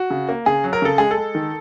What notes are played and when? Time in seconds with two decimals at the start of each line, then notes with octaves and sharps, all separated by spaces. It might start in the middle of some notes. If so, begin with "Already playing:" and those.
Already playing: F#4
0.10 C#3
0.29 A#3
0.46 C#3 G#4
0.64 F#3
0.73 A#4
0.82 C#3 A4
0.98 G#3 G#4
1.11 A4
1.17 G#3
1.35 D#3